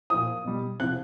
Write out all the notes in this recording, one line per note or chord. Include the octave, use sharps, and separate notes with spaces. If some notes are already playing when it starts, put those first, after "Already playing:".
A#2 F3 D#6
B2 G3
C3 F3 F#6